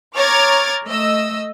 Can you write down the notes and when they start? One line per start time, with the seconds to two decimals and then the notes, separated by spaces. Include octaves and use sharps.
0.14 C#5 A#5 D6 F6 G#6 A6
0.86 A3 D#5 E6